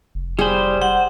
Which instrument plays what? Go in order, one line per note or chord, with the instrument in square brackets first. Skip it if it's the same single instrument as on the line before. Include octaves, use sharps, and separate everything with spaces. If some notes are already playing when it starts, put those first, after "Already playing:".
[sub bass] F1
[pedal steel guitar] G3 C5 [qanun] G#4 B5
[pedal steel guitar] C5 [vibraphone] F#5